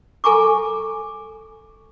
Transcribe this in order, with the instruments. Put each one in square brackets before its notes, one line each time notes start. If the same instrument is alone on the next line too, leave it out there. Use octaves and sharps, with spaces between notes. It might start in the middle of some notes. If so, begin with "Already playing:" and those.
[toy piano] A4 G#5 A#5 C#6 D6